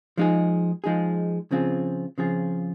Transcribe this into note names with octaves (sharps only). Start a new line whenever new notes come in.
F3 G#3 D#4 G#4
F3 G#3 D#4 G#4
C#3 F3 C4 F4 G#4
C#3 F3 C4 F4 G#4